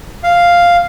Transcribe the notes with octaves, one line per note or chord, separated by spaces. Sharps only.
F5